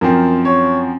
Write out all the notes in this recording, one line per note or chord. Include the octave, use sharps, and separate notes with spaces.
F#2 F3 C4 A#4
C#5